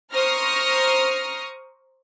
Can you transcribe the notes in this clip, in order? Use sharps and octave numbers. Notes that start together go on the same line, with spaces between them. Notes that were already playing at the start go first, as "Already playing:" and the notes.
C5 A#5 C#6 D#6 F6 A#6